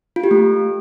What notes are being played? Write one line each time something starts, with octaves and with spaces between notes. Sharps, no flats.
F4
G4
A3